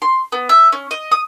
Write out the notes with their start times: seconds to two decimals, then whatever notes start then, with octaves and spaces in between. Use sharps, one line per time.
0.02 C6
0.32 B3
0.49 E5
0.72 C#4
0.91 D#5
1.11 D#6